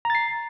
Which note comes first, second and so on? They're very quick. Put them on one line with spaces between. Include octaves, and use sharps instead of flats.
A#5 A6 C7